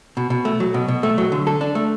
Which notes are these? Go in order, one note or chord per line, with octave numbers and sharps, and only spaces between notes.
B2
B2
A3
F#3
B2
B2
A3
F#3
D3
A4
D4
A3